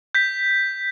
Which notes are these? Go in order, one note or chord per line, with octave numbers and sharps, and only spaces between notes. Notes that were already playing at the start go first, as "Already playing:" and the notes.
G6 B6